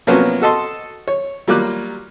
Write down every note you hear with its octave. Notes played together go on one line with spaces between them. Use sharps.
C3 F3 F#3 A#3 B3 C#4
F#4 A4 D#5 A5 C6
C#5
F#3 G3 A#3 F4 D6 F#6